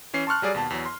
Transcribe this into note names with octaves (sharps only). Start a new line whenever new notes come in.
E3 C#4 C7
A5 C6 C#6 F6 F#6
F#3 G3 G#4 D5
D#2 B2 A5
E2 F#3
C6